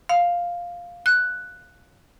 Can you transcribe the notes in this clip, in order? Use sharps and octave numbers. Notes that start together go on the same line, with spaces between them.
F5
F#6